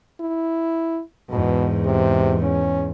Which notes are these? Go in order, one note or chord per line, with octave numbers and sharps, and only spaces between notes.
E4
E2 G#2 B2
C3
C#4